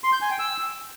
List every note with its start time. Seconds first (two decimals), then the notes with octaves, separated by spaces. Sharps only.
0.04 C6
0.13 G6
0.22 G#5
0.30 G5
0.39 E6